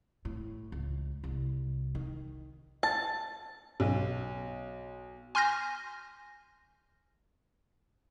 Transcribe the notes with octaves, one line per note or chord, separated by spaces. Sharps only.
A2
C#2
C2
D#3
A5 A6
B1
G#5 C6 F6 G6 A#6